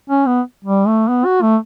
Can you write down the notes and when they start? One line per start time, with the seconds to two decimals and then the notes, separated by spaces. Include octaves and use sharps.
0.10 C#4
0.26 B3
0.64 G3
0.87 A3
1.08 B3
1.25 F#4
1.42 A3